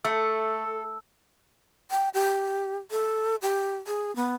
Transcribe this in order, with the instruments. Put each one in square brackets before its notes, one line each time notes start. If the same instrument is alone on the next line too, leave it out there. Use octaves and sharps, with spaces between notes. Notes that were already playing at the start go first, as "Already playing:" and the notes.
[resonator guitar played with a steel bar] A3 [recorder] A4 [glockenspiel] E6
[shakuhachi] G5
G4
A4
G4
G#4
B3